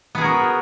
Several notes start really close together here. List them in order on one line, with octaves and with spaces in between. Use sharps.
B3 G#4 A#4 F#4